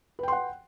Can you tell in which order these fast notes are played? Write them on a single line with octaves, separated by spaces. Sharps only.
B4 G5 C6 F#5